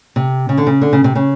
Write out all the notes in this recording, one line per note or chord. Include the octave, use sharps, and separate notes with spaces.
C3
C#3
D3
C#3
D3
C#3
C3
C#3